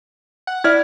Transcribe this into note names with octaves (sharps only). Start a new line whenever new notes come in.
F#5
E4 D5 F6 G#6